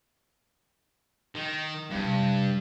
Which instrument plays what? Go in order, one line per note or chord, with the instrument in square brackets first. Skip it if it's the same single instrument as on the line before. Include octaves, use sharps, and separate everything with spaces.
[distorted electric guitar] D#3
[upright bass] E2 G3 [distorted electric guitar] G2
[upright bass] C3
F2 C3